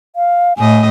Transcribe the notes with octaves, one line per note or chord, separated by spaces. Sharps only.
F5
A2 D#5 G#5